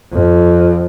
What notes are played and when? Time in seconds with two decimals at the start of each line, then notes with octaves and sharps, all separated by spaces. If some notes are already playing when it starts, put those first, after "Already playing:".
0.12 F2